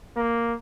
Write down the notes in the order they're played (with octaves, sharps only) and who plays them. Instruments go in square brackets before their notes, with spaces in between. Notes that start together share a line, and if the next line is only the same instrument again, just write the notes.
[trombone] A#3